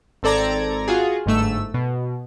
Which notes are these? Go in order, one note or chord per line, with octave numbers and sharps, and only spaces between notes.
G#1 C4 A4 D5 A#5 G#6
F4 F#4 G#4
G1 G#2 A3 E6
B2